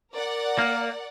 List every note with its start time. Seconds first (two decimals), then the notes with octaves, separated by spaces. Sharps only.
0.13 A#4 D5 F#5
0.59 A#3